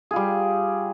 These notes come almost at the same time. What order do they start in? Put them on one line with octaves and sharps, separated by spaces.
G#4 F4 G3